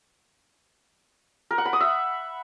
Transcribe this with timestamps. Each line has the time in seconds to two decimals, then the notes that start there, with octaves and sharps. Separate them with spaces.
1.51 A#4
1.58 F#5
1.65 B5
1.73 D#6
1.80 E5